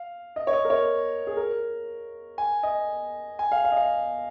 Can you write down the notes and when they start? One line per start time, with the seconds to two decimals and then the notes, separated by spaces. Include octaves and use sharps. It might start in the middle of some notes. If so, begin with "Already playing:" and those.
Already playing: F5
0.36 D#5
0.47 C#5
0.53 D#5
0.65 A#4
0.70 C#5
1.27 G#4
1.37 A#4
2.38 G#5
2.63 D#5
3.39 G#5
3.52 F5
3.64 F5
3.72 D#5
3.77 F5